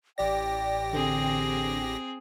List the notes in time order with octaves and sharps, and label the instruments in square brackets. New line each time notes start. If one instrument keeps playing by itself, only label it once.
[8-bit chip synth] A1 G4 A#6 [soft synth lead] D5 [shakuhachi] G5
[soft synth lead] D3 [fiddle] C4 G#4